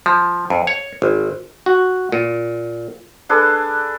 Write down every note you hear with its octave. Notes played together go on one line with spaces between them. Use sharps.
F3
F2
C#5
G#1
F#4
A#2
D4 G#4 A4 B4